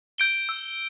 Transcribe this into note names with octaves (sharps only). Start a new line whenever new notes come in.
G6 D7 G7
E6